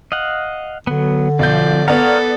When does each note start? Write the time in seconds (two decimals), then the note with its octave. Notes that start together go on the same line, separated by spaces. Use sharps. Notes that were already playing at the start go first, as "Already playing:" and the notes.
0.12 D#5 F5 F#5
0.87 D3 F#3 B3
1.39 B1 F3 D5 G6
1.88 B3 A4 A#4 C#5 D5 F5 F#5